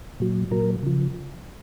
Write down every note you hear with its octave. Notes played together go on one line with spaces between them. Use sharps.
A#2 F#3
A#2 F#3 A#4
C#3 F3